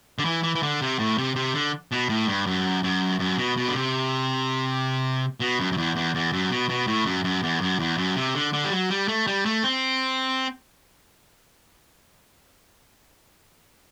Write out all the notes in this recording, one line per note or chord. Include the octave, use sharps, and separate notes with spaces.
D3
E3
E3
E3
D3
C3
A2
C3
C3
D3
B2
A2
G2
F#2
F#2
F#2
B2
B2
D3
C3
B2
F#2
F#2
E2
E2
E2
F#2
B2
B2
A2
F#2
F#2
E2
F#2
E2
F#2
C3
D3
D3
G3
F#3
G3
A3
G3
A3
C4